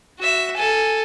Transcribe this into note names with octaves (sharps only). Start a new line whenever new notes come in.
F#4 E5
A4 G#5